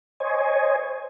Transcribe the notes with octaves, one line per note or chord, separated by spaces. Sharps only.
C5 C#5 D#5 G#5